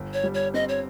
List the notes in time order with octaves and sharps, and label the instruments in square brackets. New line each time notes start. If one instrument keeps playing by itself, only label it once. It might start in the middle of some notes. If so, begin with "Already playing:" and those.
Already playing: [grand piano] G1
[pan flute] C#5
[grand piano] G3
[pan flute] C#5
[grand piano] C4 [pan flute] D#5
[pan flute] C#5